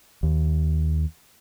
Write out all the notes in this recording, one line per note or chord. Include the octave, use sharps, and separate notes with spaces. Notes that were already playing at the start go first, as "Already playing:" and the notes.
D#2